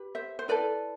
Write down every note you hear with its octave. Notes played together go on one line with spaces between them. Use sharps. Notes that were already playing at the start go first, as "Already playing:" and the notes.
Already playing: G4 B4
C5 E5
C5
E4 A4 B4 D5